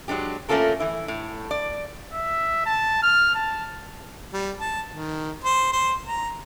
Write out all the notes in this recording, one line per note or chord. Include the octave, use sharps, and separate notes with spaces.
F#3 G#3 D4 G4
A3 A#3 C#4 F4 A4 A#4
E3 E4
A2
D5
E5
A5
F6
A5
G3
A5
D#3
C5
C5
A#5